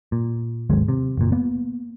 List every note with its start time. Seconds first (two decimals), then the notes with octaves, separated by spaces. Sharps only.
0.12 A#2
0.70 G#1 D#2 F#3 G#3
0.88 C3
1.17 F#1 A#2
1.32 A#3 B3